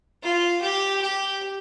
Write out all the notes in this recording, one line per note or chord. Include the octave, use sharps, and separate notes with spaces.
F4
G4
G4